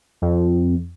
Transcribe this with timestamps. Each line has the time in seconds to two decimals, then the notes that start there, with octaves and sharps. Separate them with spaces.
0.22 F2